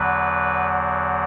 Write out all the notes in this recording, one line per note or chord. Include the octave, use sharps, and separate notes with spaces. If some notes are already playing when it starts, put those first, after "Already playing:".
Already playing: E2 D3 F#3 B4